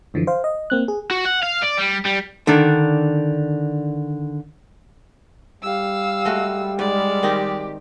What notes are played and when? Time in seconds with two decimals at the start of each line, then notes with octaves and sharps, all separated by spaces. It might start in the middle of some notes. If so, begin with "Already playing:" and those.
0.14 F#2 D3 E3 F3
0.27 C5 F5
0.44 D#5
0.70 A#3 C4 F#6
0.88 G#4
1.11 F#4
1.25 F#5
1.43 F5
1.63 D5
1.79 G3
2.06 G3
2.47 D3 D#3 D4
5.63 G3 F5 E6
6.25 G#3 A3 F#4
6.79 G#2 G#3 D5
7.23 D#3 C4 D#4 G4